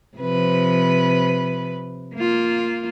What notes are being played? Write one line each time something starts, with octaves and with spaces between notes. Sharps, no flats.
C3 F3 B4
A#3 F4